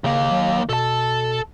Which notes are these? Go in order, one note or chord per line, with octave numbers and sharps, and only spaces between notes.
D#2 C#3 A#3
F#3
B2 A4 A5